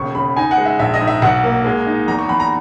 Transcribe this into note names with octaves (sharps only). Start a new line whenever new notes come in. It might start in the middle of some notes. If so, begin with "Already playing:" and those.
Already playing: E1 D#2 C#3 C#6
C#3 B5
D#4 G#5
F#5
G#3
E5
A#1 E5
D#5
G#2
E5
B1 F#5
A#3
G#3
D#4
E2 A#5
C#6
E2 B5
A#5